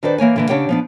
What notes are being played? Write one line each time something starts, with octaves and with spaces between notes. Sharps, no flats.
D#3 D4 A4 B4 C5 D5
E3 A#3 C#5 G#5
D3 E3 A#3
C#3 D4 G4 C#5 F#5 G5
F3 B3 D4